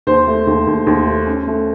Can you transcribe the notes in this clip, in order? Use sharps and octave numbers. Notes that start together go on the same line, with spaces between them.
D#2 C5
A3
D#2
D#2
D#2
A3
C#4
A3